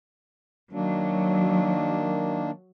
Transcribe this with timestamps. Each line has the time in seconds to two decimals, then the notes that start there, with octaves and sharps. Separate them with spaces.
0.73 D#3 F#3 A#3 D4